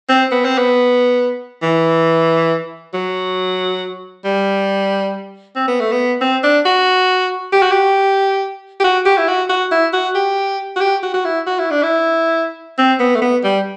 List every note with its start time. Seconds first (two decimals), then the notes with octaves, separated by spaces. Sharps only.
0.09 C4
0.31 B3
0.45 C4
0.58 B3
1.63 E3
2.94 F#3
4.25 G3
5.56 C4
5.68 B3
5.80 A3
5.92 B3
6.21 C4
6.44 D4
6.66 F#4
7.53 G4
7.62 F#4
7.72 G4
8.80 G4
8.84 F#4
9.06 G4
9.18 E4
9.28 F#4
9.49 F#4
9.71 E4
9.93 F#4
10.15 G4
10.76 F#4
10.81 G4
11.03 F#4
11.14 F#4
11.25 E4
11.47 F#4
11.59 E4
11.71 D4
11.83 E4
12.78 C4
13.00 B3
13.15 A3
13.22 B3
13.44 G3